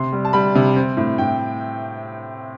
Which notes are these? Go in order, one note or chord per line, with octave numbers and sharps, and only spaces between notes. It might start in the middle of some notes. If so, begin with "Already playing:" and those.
Already playing: C3 C6
G3
A5
G3 B5
C3
C4
A2
A2 G5